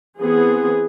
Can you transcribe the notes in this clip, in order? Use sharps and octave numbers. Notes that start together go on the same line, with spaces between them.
E3 B3 C4 G#4